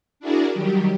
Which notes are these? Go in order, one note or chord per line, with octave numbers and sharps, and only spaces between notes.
D4 E4 F#4 G#4 A#4 D5
D#3 F#3 G3 G4